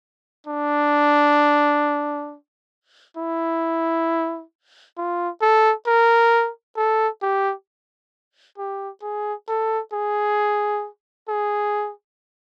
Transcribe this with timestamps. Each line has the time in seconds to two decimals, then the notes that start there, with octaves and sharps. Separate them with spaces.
0.47 D4
3.17 E4
4.98 F4
5.42 A4
5.87 A#4
6.77 A4
7.22 G4
8.58 G4
9.02 G#4
9.48 A4
9.93 G#4
11.29 G#4